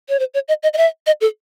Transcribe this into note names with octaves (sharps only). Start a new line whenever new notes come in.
C#5
C5
C#5
D#5
D#5
D#5
E5
D#5
A4